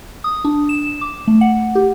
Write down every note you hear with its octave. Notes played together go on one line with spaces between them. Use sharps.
D#6
D4
E7
D6
A3
F#5
G4